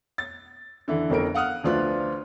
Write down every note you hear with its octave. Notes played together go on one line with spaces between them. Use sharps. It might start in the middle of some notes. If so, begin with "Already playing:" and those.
A6
D3 E3
G1 F2 A#4 D7
F5 F#5 D#6 F6 F#6
D2 F3 D4 F4 B4 F#6